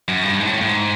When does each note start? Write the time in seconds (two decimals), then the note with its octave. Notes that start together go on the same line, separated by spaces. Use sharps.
0.08 F#2
0.24 G2
0.40 G#2
0.46 A2
0.61 A2
0.69 G#2